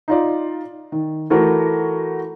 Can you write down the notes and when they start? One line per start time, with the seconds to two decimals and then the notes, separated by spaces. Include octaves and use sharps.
0.08 D#4 F4 D5
0.92 D#3
1.30 E3 A3 F#4 A#4